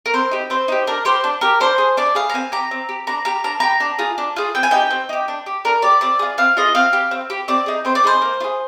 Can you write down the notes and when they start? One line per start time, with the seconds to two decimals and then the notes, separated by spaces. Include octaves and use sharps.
0.06 A#4
0.13 C4 C5
0.31 D#4 G4
0.50 C4 C5
0.68 D#4 G4
0.87 D4 A#4
1.05 G4 C5
1.24 D4
1.41 G4 A#4
1.60 D4 C5
1.78 G#4
1.97 D4 D5
2.15 G#4 F5
2.30 A#5
2.34 C4 G#5
2.52 G4 A#5
2.71 C4
2.89 G4
3.07 D4 A#5
3.25 G4 A#5
3.44 D4 A#5
3.60 G4 A#5
3.80 D4
3.99 F4 G#4
4.18 D4
4.36 F4 G#4
4.55 C4 G5
4.63 G#5
4.71 D#4 G4 G5
4.90 C4
5.09 D#4 G4
5.28 D4
5.46 G4
5.65 D4 A#4
5.82 G4 D5
6.01 C4 D5
6.19 F4 G#4
6.38 C4 F5
6.57 F4 G#4 D#5
6.75 C4 F5
6.93 G4
7.11 C4
7.30 G4
7.48 C4 D5
7.66 D#4 G#4
7.85 C4 C5
7.95 D5
8.04 D#4 G#4 C5
8.22 A#3
8.40 F4
8.44 G#4